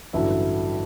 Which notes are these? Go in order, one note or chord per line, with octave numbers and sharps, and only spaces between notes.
A1 G2 D3 F#3 E4